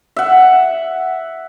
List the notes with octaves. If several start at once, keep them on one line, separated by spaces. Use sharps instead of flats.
E5 F#5